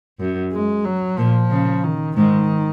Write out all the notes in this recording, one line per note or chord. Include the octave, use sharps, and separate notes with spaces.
F#2
G#3
F#3
A#2 F3
C#3
D#3
G#2 D#3 G#3